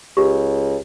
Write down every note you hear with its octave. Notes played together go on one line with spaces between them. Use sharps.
C#2 G4